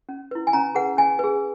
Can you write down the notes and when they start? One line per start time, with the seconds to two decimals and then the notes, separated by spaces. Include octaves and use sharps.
0.09 C#4
0.31 E4 B4
0.47 G#5
0.53 C#4 A#5
0.75 G#4 B4 F#5
0.97 C#4 G#5
1.19 G#4 B4